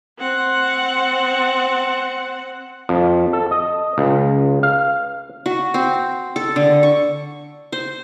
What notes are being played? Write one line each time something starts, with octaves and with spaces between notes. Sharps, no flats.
C4 F#5
F2
A4
D#5
C#2
F5
F#4
C4
A4
D3
C#6
C5